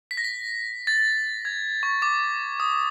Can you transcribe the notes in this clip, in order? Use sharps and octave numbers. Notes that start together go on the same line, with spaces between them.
B6
A#6
B6
A6
G#6
C#6
D6
D#6